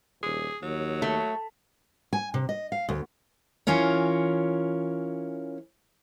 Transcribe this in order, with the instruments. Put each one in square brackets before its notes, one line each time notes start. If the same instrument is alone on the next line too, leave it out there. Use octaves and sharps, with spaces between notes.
[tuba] D#1 [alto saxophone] G#4
[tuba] D#2 [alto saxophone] F#3
[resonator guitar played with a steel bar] A3
[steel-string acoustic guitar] G#5
C3
D#5
F5
D2
E3 C#4 F4 A#4 C#5